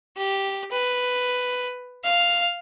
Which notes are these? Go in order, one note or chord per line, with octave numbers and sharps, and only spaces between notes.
G4
B4
F5